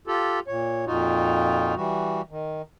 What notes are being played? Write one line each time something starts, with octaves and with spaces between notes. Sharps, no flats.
F4 G4 A4
A#2 C#5
F2 A#2 D#4 F4 F#4
E3 G3 F#4
D#3